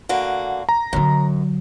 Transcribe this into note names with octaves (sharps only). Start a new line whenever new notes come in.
D3 A#3 F#4
A#5
F#2 D3 F#3